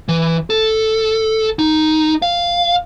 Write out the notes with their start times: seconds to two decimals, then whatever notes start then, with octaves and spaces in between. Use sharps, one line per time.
0.08 E3
0.50 A4
1.59 D#4
2.22 F5